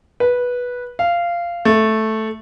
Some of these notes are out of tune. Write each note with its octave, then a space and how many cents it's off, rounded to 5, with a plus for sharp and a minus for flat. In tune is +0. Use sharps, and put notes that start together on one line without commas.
B4 -10
F5 -15
A3 -5